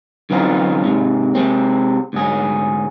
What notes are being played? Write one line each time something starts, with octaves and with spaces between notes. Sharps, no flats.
F#2 D3 E3 C4 D#4 F4
G#2 C3 G#3
C3 G#3 C4
D2 G#2 G#4